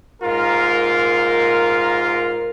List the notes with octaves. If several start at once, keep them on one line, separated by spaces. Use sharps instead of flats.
G#2 F4 A#4